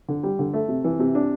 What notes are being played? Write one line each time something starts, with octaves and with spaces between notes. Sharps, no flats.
D3
G3
D3
A3
C3
E3
C3
D4